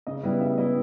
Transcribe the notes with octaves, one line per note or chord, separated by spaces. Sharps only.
C#3 D#5
G3 B3 E4
C#3 E5
G3 B3 E4 D#5